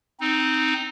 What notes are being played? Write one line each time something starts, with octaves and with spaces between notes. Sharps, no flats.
C4 D#4